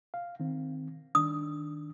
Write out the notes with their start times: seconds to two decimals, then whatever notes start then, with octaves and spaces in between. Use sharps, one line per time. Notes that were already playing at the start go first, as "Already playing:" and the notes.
0.14 F5
0.40 D#3 C4
1.15 D#3 D4 D#6